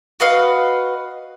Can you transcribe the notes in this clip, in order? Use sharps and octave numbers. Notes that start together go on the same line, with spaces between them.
F#4 B4 D#5 F5